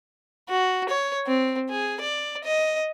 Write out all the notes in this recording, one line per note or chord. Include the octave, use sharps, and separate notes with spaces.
F#4
C#5
C4
G#4
D5
D#5